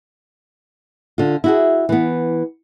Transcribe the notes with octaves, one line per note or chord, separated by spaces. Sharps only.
D3 F4
E4 F#4 G#4
E3 B3